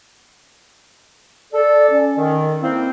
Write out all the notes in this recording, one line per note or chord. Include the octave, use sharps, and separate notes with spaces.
A4 D5
C#4
D#3
A#3 C4 E4 C5